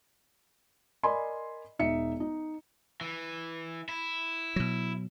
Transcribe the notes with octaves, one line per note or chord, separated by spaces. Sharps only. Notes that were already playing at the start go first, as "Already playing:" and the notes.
A#4 D5 D#5 G#5 B5 C6
E1 D#4 E5 C#7
D#4
E3
E4
B2 F#3